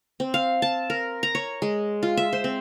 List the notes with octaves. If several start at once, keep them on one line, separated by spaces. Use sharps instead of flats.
C4
F5
A5
A#4
A#5
C#5
G#3
F4
E5
C5
C4